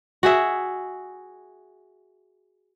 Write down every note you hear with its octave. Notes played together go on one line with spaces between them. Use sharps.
F#4 G#4 E5